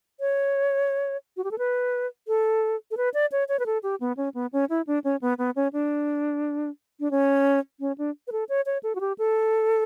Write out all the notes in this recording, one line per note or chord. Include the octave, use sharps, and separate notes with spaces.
C#5
F#4
G4
A4
B4
A4
A4
B4
D5
C#5
C#5
B4
A4
G4
B3
C#4
B3
C#4
E4
D4
C#4
B3
B3
C#4
D4
D4
C#4
C#4
D4
B4
A4
C#5
C#5
A4
F#4
G4
A4